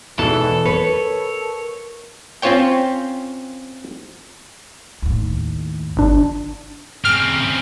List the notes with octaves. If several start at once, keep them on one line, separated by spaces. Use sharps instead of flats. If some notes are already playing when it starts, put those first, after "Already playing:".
E2 G#2 B2 E3 A4
A#4 B4 C#5
C4 C#4 F4 C5 C#5 G5
D#2 A2
G1 D4
C#3 C4 F6